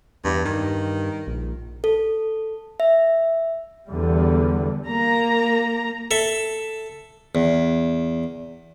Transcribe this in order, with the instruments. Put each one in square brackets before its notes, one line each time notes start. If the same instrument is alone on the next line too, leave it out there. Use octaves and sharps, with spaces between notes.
[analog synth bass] E2 [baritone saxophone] G2
[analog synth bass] G2 [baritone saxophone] D#3
[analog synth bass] A#1
[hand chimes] A4
E5
[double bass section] E2 D3 G3
[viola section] A#3 A#5
[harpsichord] A4 E5
E2